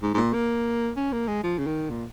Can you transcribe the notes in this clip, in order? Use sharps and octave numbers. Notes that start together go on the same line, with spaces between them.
G#2
G#2
A#2
A#3
C#4
A#3
G#3
F3
C#3
D#3
A#2